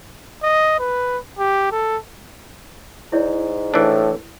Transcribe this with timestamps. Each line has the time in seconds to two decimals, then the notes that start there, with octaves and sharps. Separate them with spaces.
0.43 D#5
0.79 B4
1.39 G4
1.71 A4
3.12 G#2 E4 C#5 D5
3.74 A2 E3 D4